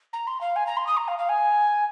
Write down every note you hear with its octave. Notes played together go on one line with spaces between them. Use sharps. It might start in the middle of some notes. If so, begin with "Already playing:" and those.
A#5
C6
F5
G#5
A#5
C6
D#6
A#5
F5
F5
G#5